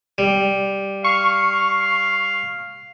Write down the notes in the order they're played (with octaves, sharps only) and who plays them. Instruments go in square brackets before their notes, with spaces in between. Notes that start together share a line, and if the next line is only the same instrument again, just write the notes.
[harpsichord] G3
[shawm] F5 [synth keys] C#6